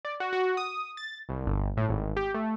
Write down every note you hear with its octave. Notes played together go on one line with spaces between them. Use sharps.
D5
F#4
F#4
D#6
A6
C2
G1
A2
G#1
G4
A3